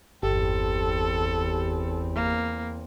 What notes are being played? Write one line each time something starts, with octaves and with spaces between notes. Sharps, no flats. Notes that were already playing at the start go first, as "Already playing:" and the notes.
G1 E2 C4 G4 A4
A#3